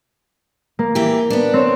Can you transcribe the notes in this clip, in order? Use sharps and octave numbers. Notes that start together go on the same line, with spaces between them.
A#3
E3 G4
B3 D4
C4 C#5